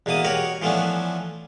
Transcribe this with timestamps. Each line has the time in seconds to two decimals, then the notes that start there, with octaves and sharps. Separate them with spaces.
0.06 E2 B2 A#3 A5 D#6
0.24 F#4 G4 A#4 C#5 F#5
0.62 E3 F3 A3 B3 C#4 D4